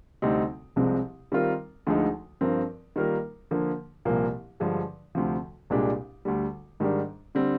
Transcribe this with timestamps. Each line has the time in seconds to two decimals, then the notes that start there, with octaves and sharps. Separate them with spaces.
0.22 D2 C3 G3 C4 D#4
0.76 C2 C3 F3 G#3 C4
1.32 D#3 G3 C4 F4 A#4
1.87 D2 D3 F3 G#3 D#4
2.41 G2 F3 C4 F4 A#4
2.96 D#3 G3 A#3 F4 A#4
3.51 D3 F3 A#3
4.05 C2 A#2 F3 A#3
4.60 G2 D3 F3 G#3
5.15 D2 C3 F3
5.70 C2 A#2 G#3 D4 G4
6.25 D2 D3 G3
6.80 G#2 D#3 G3 D4
7.35 D3 G3 C4